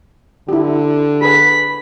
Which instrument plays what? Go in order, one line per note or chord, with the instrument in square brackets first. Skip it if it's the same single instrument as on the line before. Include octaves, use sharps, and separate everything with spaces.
[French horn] D3 [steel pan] E4 G4
[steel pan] G#4 B4 [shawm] B5